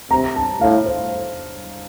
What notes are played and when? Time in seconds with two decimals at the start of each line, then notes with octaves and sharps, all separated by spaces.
0.11 C3 A#5
0.36 A5
0.61 A2 F5
0.86 C5